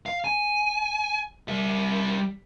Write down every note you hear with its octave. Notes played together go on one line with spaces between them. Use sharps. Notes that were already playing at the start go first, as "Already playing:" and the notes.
F5
G#5
G3 E5